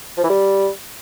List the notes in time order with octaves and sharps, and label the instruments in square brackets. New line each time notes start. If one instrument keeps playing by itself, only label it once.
[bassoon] F3
E3
G3